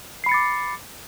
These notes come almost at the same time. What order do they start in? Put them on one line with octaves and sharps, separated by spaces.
C7 B5 C#7 A6 D6